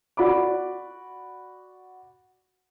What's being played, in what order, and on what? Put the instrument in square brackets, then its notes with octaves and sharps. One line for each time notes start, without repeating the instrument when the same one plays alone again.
[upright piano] F#4 D5 B5 D6